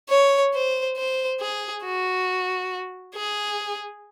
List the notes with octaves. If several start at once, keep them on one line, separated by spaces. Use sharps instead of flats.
C#5
C5
C5
G#4
F#4
G#4